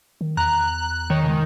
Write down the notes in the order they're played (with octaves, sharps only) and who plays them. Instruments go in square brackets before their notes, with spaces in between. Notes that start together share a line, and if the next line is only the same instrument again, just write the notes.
[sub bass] D#3
[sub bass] E2 [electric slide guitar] A#5 [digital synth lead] F#6
[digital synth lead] D#3 [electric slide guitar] C#5
[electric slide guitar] C#3 G#3